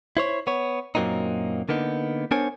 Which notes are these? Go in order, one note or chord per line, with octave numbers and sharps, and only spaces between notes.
E4 C5 C#5
B3 C#5
F#2 A#2 F#3 A#3 C4 D#4
D3 A#3 B3 D#4
B3 D4 A#4 C5 C#5 G#5